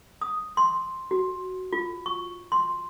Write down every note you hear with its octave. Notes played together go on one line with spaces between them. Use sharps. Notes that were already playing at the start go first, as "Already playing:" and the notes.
D#6
C6
F#4
F4
C#6
C6